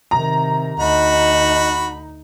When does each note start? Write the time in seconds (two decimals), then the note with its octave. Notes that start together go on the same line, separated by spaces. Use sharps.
0.11 C3 D#3 A#5
0.80 D2 D#4 F#4 D#5 B5